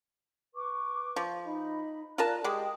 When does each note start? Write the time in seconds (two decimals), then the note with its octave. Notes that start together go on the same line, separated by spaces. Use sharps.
0.55 B4 C#6 D6
1.16 F3
1.46 D#4 D#5 B5
2.18 F4 A#4 D5 A5 A#5 F#6
2.44 G#3 G4 D#5 G5 D#6